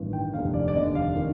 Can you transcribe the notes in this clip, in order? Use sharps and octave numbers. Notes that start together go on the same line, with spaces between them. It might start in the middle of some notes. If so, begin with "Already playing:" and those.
Already playing: A1 G2 D#3
G5
F1 D#2 D3 F5
D5
D5
F1 D#2 D3 D#5
F5
D#3